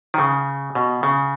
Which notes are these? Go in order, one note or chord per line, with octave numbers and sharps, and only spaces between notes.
D#3
C#3
B2
C#3